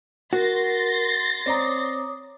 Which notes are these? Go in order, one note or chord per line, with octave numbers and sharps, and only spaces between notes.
F#4 A#4 C6 A6 A#6
C4 C#5 D5 A#5 D6 D#6